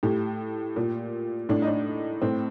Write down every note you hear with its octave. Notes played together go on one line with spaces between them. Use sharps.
A2 G4
A#2
A2 D4
D#4
D4
A2 C4